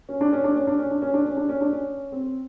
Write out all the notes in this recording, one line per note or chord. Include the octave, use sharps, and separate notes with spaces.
C#4
D4
C#4
D4
C#4
D4
C#4
D4
C#4
D4
C#4
D4
C#4
D4
C#4
C4